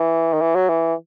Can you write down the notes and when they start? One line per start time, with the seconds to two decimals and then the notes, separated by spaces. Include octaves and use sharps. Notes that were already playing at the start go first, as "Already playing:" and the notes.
Already playing: E3
0.33 D#3
0.41 E3
0.55 F#3
0.69 E3